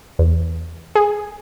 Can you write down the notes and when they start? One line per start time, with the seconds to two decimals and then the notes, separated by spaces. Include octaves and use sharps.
0.19 E2
0.95 G#4